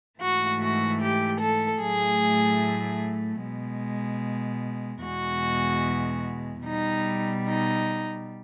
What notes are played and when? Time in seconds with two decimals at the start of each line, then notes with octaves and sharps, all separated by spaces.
0.19 G#2 E3 A3 F#4
0.60 F#4
1.01 G4
1.40 A4
1.81 A2 F#3 A3 G#4
3.42 B2 G#3
5.04 E2 B2 G#3 F#4
6.65 B2 G3 D#4
7.46 D#4